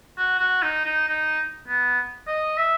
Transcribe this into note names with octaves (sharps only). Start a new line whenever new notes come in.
F#4
F#4
D#4
D#4
D#4
B3
D#5
E5